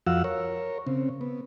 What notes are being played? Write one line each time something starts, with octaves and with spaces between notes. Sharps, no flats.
F2 F3 F#4 F5 F#5 E6
A#4 C#5
C#3 C4
B3